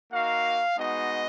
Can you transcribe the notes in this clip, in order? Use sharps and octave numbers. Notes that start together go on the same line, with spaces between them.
A#3 D#4 F#4 F5
G#3 B3 D#4 F#4 D#5